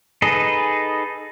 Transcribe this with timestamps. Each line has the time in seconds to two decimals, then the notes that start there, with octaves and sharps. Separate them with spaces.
0.22 D#4 G#4 A4 B4 D#5